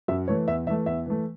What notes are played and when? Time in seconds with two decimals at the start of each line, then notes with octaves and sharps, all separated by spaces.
0.08 F#2 E5
0.28 E3 A3 C#5
0.48 E2 E5
0.67 E3 E5
0.70 A3
0.86 E2 E5
1.06 E3 A3